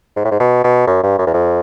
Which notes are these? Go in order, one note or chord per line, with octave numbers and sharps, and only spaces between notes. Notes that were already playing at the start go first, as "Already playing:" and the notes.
G#2
A2
G#2
B2
B2
F#2
G2
F#2
E2
F2